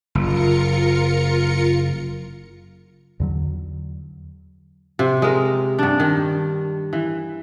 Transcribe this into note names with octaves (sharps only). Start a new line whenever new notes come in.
F#1 F4 A#4 C#7
E2 D3 F#3
C3
G#3 A#4
G2 D4
D#3
E3